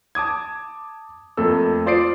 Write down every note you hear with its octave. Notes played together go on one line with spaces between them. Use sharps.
A5 D6 D#6 G#6
F2 A3 A#3 A4 E6
F4 C5 D5 D#6 C7 D7